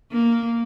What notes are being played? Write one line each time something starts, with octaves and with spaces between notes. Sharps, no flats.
A#3